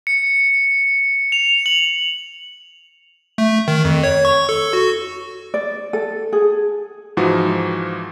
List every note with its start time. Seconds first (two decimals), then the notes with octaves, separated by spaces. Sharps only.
0.07 C#7
1.32 F7
1.66 F#7
3.38 A3
3.68 D#3
3.85 F2
4.04 C#5
4.25 C#6
4.49 A4
4.73 F#4
5.54 D5
5.93 A4
6.33 G#4
7.17 G#2 E3 F3 F#4